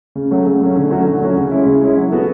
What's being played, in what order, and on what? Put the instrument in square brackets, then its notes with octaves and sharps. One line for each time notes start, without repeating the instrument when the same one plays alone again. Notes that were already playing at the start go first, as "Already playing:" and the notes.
[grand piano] C#3
F#3 A3 C#4
C#3
F#3 A3 C#4
D3
F#3 A3 C#4 F#4
D3
F#3 A3 C#4 F#4
C#3
G#3 C#4 E4
C#3
G#3 C#4 E4
F#3
B3 F#4 A4